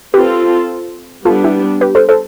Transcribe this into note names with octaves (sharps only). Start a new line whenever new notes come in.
C4 F4 G4 A4 B4
G3 B3 D4 F4 A4
E4 G4
G4 B4
A4 C5
A4 C5